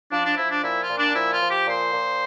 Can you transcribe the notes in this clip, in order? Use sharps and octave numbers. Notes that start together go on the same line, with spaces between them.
F3 D4
D4
F3 E4
D4
A#2 E4
F4
A#2
D4
F3 E4
F4
F3
G4
A#2 C5
A#2